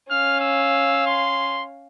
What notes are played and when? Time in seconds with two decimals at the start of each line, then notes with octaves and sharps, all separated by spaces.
0.10 C#4 F5 F6
0.41 E6
1.07 C6